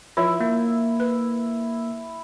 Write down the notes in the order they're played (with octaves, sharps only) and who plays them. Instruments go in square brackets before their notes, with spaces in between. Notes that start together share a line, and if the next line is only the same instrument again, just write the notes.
[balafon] F3 F4 C#5 [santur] E4 E5
[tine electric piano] A#3
[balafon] B4